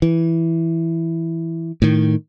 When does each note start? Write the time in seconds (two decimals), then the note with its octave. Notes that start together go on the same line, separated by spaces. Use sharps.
0.02 E3
1.82 A2 D#3